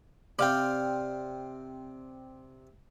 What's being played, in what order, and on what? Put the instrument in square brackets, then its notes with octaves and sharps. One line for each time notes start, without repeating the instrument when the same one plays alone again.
[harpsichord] C3 C4 [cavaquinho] D5 F5 G5